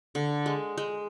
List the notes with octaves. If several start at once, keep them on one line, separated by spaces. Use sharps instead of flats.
D3
G#3
G#3